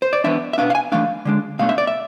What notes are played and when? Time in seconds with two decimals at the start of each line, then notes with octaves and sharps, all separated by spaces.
0.02 C5
0.13 D5
0.24 E3 B3 D4 E5
0.53 E5
0.58 B2 B3 D4 F5
0.70 F5
0.75 G#5
0.92 E3 A3 D4 F5
1.25 D3 G#3 D4
1.59 B2 A3 D4 F5
1.69 E5
1.78 D5
1.87 E5